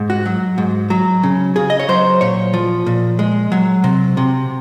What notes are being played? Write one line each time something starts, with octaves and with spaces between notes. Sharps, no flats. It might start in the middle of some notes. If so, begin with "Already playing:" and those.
Already playing: G#2
F#4
F#3
G#2
F#3
C#3
C#3 G#4
D#5
C#5
F#3 C5
A#2 C#5
F3
A#2
G#3
F#3
C3
C3